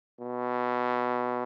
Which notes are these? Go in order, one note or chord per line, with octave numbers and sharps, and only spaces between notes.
B2